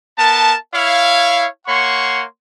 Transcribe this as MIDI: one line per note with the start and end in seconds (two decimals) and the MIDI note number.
0.18 0.55 59
0.18 0.55 70
0.18 0.55 81
0.75 1.46 64
0.75 1.46 73
0.75 1.46 77
1.68 2.24 58
1.68 2.24 73
1.68 2.24 78
1.68 2.24 84
1.68 2.24 85